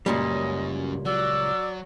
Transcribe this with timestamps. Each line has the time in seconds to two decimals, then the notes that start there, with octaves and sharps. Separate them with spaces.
0.06 C#2 F#2 A#2 G3 C#4 D#5
1.05 F#3 D5 E6